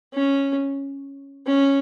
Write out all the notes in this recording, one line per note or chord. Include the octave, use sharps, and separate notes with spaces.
C#4
C#4